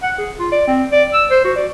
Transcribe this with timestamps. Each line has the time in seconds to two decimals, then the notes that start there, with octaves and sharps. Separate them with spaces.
0.03 F#5
0.18 G#4
0.39 F4
0.52 D5
0.67 C4
0.92 D5
1.14 E6
1.30 C5
1.45 F#4
1.56 D5